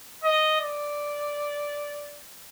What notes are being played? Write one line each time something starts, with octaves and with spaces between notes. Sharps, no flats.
D#5
D5